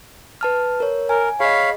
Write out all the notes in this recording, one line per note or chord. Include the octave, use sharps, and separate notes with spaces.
B4 A5 F6
A#4 C#5
A#4 G#5
G#4 C#5 D#5 F5 B5